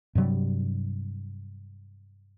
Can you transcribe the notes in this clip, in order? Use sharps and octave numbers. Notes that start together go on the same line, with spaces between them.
G2 C3 F#3 G3